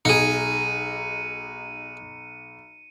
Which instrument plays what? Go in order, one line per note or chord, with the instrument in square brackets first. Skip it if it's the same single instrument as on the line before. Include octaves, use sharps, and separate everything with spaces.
[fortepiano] B1 [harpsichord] D#4 G#4 [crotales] C#7 D#7